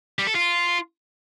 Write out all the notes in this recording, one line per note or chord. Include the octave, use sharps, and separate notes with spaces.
G3
A4
F4